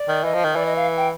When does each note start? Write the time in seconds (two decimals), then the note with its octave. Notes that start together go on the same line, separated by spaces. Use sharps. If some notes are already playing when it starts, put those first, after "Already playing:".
Already playing: D5
0.08 D#3
0.24 E3 D#5
0.34 F3
0.44 D#3
0.55 E3 D5
0.66 D#5
0.76 F5
0.97 G5